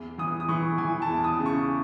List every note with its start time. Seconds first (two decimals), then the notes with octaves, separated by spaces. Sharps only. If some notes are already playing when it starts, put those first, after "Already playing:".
Already playing: E2
0.18 E3 D#6
0.40 D#6
0.48 E3 C#6
0.78 E3 G#5
1.02 A5
1.09 E2
1.24 D#6
1.39 C#3
1.46 C#6